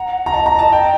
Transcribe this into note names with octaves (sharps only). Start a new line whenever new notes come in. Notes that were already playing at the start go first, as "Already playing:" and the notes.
Already playing: F#5 A#5
A#5
D#5 A5
A#5
A5
G5